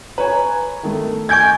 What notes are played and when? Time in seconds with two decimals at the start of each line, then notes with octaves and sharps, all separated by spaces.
0.18 B4 C#5 G#5 A#5
0.83 D#3 A3
1.29 D#5 G#5 C#6 G6 G#6